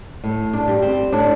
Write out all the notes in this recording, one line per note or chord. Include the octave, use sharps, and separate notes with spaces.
A2
D4
G3
C4
A2 D4